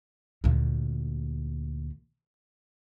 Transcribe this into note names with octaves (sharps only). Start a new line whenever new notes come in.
D2 A#2